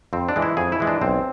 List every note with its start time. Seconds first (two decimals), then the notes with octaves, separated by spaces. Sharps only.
0.13 F2 C4
0.29 D4
0.36 E3 G#3
0.42 E4
0.57 F2 G#4
0.72 E4
0.80 E3 G#3
0.87 D4
1.01 B1 C4